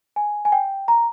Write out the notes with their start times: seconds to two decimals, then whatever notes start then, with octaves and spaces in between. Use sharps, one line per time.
0.16 G#5
0.45 G#5
0.52 G5
0.88 A#5